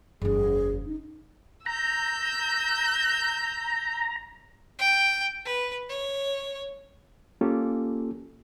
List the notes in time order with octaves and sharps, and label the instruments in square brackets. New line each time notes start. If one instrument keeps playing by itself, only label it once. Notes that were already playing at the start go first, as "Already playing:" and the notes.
[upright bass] F#1 E2 [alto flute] G#4
[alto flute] D#4
[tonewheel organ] A#5 [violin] E6 G6
[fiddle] G5
B4
C#5
[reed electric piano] A#3 C#4 F4 G4 A4